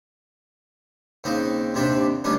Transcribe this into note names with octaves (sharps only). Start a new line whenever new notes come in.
D#2 C#3 C4 D#4
D#2 C3 C4 D4 B5
D2 D#3 G3 C#4 D4